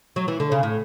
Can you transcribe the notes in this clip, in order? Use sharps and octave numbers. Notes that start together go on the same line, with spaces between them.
F#3
E3
D3
C#3
A2